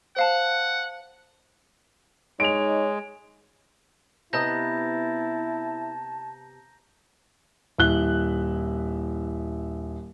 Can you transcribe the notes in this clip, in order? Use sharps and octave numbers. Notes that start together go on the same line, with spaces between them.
C5 F5 F#5 A5
G#3 D#4 C#5 D7 F7
C3 B3 E4 D#5 A5 A#5 G6 A#6
D#1 E4 F#6 G7